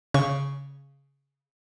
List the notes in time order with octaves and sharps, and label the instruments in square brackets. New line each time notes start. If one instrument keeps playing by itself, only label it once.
[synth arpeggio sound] C#3 C#6